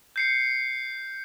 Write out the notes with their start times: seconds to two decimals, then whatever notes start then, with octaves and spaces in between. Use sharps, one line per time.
0.16 G6 C7 C#7